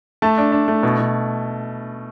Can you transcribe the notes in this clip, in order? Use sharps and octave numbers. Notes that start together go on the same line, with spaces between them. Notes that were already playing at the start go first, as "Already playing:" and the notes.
A3 A5
D4
D4
A3
B2
B2